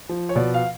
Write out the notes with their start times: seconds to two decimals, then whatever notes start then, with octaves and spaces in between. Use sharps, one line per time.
0.09 F3
0.29 C#5
0.36 B2 D5
0.54 F5